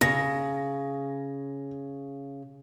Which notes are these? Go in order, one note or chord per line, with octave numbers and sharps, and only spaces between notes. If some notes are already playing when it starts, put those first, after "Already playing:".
C#3 A#6